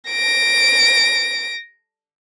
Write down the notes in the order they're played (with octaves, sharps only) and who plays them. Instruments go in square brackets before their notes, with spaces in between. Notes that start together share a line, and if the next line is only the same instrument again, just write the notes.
[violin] A#6 D7